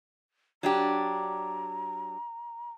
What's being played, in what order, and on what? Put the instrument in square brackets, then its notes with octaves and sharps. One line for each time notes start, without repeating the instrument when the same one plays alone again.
[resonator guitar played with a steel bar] F#3 D4 G4 [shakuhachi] A#5